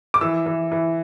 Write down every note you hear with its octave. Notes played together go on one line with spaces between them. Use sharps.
D6
E3 E6
E3
E3